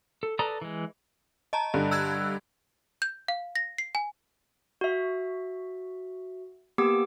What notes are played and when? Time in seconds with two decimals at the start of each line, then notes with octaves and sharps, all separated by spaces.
0.23 A4
0.39 A4 B4 D5 A#5 D#6
0.62 E3 G#3
1.53 D#5 A5 A#5
1.74 G2 D3
1.91 E6 F#6 G#6
3.02 G6
3.28 F5
3.55 A#6
3.78 C7
3.95 G#5
4.81 F#4 E5
6.78 A#3 B3 G4 D6 E6